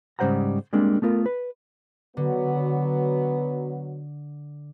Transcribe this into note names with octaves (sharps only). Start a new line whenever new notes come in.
G#2 C#3 G3 C5 F#5 A#5
G3 G#3 A#3 C4 D4
A3 B3 F4 A#4
B4
D3 F#3 B3